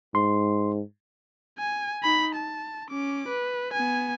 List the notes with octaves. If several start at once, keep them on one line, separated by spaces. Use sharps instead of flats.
G#2 C6
G#5
D#4 B5
A5
C#4 D6
B4
B3 G#5